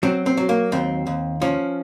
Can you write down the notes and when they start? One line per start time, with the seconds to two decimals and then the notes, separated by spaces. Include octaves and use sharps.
0.03 F#3 C4
0.26 C4
0.37 F#3
0.49 A#3
0.72 D#2 C4
1.07 D#2
1.42 F3 C#4